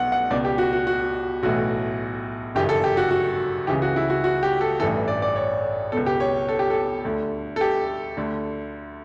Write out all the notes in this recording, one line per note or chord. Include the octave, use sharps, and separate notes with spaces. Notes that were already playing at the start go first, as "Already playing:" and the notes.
Already playing: B1 B2 F#5
F#5
C#2 B2 D5
G4
F#4
F#4
F#4
B1 A2 E3 F#4
G1 F#2 C#3 E3 G4
A4
G4
F#4
F#4
C#2 C#3 E3 G4
F#4
E4
F#4
F#4
G4
A4
A1 G2 E3 A4
D5
D5
C#5
C#2 B2 A4
G4
C#5
A4
G4
A4
D2 D3
A4
G4
D2 D3